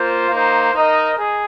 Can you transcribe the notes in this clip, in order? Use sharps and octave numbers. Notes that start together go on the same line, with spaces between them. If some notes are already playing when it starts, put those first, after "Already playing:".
Already playing: A#3 F4 C5
A#3 D#4 C5
D#4 A#4 D#5
G#4